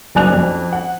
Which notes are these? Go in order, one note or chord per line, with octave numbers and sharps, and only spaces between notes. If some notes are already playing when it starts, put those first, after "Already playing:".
F#1 B1 D5 G#5 F#6 F7
F2
F#5